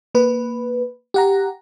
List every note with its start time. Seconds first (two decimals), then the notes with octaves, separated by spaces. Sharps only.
0.15 A#3 B4
1.14 G4 F#5 A#5